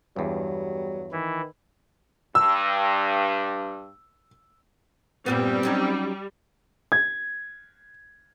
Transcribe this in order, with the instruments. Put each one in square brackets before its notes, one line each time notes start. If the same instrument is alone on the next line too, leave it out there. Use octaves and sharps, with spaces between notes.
[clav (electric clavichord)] E2 G2 [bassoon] F#3 [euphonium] G3
[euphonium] D#3 [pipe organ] E3 E4
[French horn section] G2 [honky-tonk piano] E6
[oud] G2 A#2 B3 [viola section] G3 [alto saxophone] C4
[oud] F#3 C#4 D#4
[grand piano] G#6